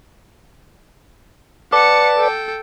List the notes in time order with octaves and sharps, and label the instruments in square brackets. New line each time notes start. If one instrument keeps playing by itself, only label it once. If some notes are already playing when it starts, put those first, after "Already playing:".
[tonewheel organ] B4 D5 [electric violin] F#5 C#7 [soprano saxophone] A5 [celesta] D6
[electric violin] A4 G5